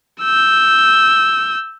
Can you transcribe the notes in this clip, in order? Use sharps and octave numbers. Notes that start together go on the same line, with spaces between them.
E6 G6